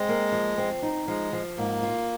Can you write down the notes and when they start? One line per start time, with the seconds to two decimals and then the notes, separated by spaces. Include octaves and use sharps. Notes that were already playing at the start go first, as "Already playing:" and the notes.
Already playing: G#3 C4
0.09 A#3
0.32 F3
0.58 C4
0.82 D#4
1.08 F3 G#3
1.33 F3
1.58 G#2 A#3
1.83 F4